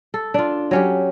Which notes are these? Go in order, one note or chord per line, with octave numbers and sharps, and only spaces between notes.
A4
D4 F4
F#3 C#4 G4